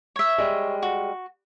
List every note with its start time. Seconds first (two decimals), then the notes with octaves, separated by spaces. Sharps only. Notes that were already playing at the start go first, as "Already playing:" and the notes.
0.16 C#5 E5
0.38 G3 G#3
0.83 F#4